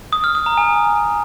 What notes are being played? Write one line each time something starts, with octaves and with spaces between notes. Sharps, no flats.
D#6
F6
D#6
A#5
G#5